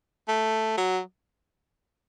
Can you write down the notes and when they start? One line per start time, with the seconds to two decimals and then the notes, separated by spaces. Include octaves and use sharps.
0.28 A3
0.78 F#3